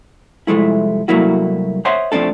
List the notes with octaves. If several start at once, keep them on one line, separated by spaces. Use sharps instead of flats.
C2 F3 G#3 A3 E4
C2 F#3 A3 A#3 E4 F#4
C5 C#5 D#5 E5 F#5 C6
F3 A3 C4 D4 A4